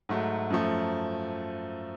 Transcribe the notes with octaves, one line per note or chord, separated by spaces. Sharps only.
G#2 F#3 A3
F#2 F3 A3